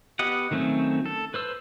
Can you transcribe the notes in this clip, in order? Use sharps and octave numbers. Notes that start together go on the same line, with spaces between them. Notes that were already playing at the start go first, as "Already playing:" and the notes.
B3 G4 D#5 F#5
D#3 F#3 A3 C4 C#4
A4
B4 C5 E6